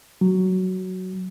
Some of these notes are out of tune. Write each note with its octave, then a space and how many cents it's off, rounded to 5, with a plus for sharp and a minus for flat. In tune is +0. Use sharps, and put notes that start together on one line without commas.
F#3 +5